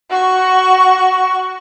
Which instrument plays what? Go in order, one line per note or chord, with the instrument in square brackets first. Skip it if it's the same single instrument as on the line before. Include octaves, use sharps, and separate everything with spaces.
[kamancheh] F#4 C#6